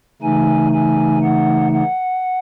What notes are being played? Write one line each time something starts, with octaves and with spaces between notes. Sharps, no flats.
C#3 E3 A3 D#4 G#5
G#5
F#5
F#5